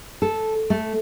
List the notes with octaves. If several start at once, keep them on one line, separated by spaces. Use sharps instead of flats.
A4
A3